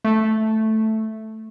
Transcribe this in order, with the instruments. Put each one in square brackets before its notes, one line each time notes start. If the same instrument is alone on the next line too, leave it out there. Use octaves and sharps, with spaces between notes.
[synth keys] A3